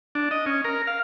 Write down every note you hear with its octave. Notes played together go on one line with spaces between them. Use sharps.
D4
D#5
C#4
A#4
F5